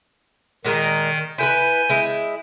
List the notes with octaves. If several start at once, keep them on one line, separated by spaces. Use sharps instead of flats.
A#2 D#3 G#3 A#4
E4 A#4 B4 G#5 G6
G#3 E4